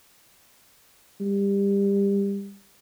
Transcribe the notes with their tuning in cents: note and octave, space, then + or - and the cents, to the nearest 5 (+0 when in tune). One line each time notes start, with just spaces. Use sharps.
G3 +25